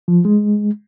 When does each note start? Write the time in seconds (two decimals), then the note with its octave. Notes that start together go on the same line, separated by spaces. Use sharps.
0.08 F3
0.25 G#3